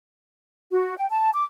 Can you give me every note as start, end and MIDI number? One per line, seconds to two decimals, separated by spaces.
0.72 0.98 66
0.98 1.08 79
1.09 1.31 81
1.33 1.45 86